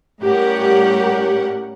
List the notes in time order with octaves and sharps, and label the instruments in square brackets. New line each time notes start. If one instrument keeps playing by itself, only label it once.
[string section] A2 G3 C#4 G4 A#4 F#5